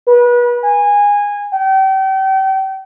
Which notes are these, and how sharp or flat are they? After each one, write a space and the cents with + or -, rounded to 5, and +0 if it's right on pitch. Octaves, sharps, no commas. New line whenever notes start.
B4 -30
G#5 -20
G5 -35